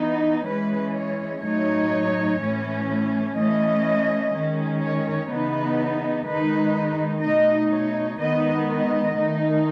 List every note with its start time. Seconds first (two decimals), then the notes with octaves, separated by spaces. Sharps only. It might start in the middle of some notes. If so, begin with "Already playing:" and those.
Already playing: E3 B3 D#4
0.46 E3 G#3 C#4 B4
0.95 C#5
1.43 A2 F#3 A3 D#4 C#5
2.40 A2 E3 A3 C#4
3.36 E3 A3 C#4 D#5
4.34 D#3 G#3 C#4
4.82 C#5
5.30 C#3 E3 B3 D#4 B4
6.27 D#3 G#3 D#4 B4
7.23 B2 A3 D#4 D#5
7.72 C#5
8.20 D#3 G#3 B3 D#4 D#5
8.68 D#5
9.16 D#3 A3 D#4